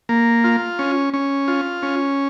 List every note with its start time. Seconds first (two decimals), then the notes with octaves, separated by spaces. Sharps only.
0.09 A#3
0.44 F4
0.79 C#4
1.14 C#4
1.48 F4
1.83 C#4